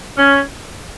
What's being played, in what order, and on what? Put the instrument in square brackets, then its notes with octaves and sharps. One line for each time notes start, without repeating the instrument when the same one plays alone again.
[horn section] C#4